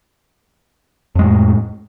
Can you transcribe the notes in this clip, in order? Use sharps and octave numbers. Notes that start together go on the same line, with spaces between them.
F2 A2 G#3